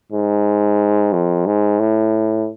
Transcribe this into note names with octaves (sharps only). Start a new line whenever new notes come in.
G#2
F2
G#2
A2